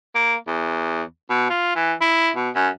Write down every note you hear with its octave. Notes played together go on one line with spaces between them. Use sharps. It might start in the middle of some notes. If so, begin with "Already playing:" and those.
A#3
E2
B2
F4
E3
E4
B2
F#2